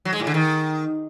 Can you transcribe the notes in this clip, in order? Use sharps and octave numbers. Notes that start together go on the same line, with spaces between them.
F#3
G#3
A2
D3
D#3